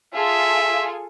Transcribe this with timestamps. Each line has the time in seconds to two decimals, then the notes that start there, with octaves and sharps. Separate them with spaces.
0.14 F4 G#4 A4 E5